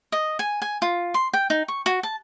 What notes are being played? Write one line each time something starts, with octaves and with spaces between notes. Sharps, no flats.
D#5
G#5
G#5
F4
C6
G5
D#4
C#6
F#4
A5